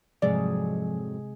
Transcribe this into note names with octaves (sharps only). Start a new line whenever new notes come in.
F2 G#2 C3 F3 F#3 G#3 G#4 D5